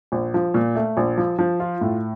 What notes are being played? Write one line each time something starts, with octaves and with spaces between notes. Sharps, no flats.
A#1
F3
A#2
A3
A#1
F3
F3
F4
A2